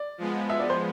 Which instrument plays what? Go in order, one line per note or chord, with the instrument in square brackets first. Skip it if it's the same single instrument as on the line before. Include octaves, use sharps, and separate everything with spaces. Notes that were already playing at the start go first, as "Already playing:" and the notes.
Already playing: [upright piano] D5
[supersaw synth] F3 G#3 B3
[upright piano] E5
D5
C5